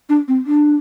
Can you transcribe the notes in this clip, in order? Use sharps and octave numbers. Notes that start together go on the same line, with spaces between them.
D4
C4
D4